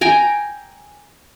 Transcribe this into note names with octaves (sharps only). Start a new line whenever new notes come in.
G5 G#5 A#5